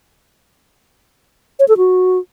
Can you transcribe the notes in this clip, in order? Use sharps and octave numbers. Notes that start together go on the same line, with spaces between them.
C#5
A4
F#4